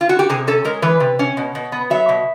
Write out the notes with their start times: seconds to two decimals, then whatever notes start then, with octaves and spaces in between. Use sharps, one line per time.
0.01 F4
0.09 F#4
0.19 G4
0.29 C3 G#4
0.47 C#4 A4
0.65 G#3 A#4
0.82 E3 B4
1.00 C3
1.19 C#4
1.37 B2
1.55 B2
1.72 B3
1.90 F#3 E5
2.09 B2